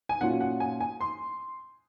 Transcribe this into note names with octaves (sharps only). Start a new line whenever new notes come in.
G#5
A#2 F#3 C#4 F4 F#5
F#5
G#5
G#5
C6